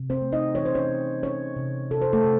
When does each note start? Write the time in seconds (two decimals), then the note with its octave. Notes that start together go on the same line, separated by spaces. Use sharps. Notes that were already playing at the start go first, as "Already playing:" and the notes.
Already playing: C3
0.10 C4 C5
0.22 A3
0.32 D#4 D#5
0.55 E3 C#5
0.65 C5
0.75 C#4 C#5
0.89 C3
1.23 E3 C#4 C#5
1.56 C3
1.91 C3 A4
2.02 C5
2.13 A3 A4
2.25 C3